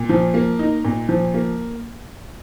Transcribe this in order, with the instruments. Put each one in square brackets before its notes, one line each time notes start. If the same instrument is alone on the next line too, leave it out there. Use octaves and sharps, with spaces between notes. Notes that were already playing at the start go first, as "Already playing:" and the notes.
Already playing: [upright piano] A#2
F3
A#3
D#4
A#2
F3
A#3